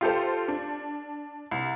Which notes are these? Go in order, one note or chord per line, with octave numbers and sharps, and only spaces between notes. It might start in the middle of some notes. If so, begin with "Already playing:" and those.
F4 G4 A4 C5
D4
C2